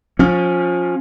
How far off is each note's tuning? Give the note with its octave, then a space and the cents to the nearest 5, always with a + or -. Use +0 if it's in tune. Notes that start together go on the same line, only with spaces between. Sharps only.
F3 +25 C#4 +0